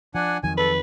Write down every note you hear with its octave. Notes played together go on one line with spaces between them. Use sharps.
F3 D4 F#5 G#5
F2 D#3 F#3 G#5
A4 B4